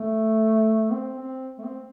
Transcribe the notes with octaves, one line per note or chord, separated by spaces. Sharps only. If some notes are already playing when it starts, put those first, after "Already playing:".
Already playing: A3
C4
C4
A3
C4